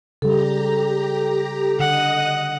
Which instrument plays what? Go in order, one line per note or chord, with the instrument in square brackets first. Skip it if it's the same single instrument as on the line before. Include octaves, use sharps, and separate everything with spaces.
[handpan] C#3 G3 [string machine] G4 A#5 [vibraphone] A4
[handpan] D3 [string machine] D#5 D#6 F#6 [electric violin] F#5